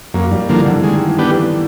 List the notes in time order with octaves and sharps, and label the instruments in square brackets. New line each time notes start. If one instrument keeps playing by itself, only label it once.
[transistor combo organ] F#2 [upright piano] A#3
[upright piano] G3
[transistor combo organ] D3 F3 A#3 [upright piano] E3
[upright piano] D3
[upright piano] D#3 [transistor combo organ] G#3
[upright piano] E3
[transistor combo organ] B3 D4 G4
[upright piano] E3